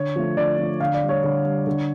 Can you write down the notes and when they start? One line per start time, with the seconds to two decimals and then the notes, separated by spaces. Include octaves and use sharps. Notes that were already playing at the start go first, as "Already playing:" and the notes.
Already playing: D3 C#5
0.16 F3 A3
0.37 D3 D5
0.59 F3 A3
0.80 D3 F5
0.94 D5
1.02 G3
1.09 C#5
1.24 D3
1.45 G3
1.67 D3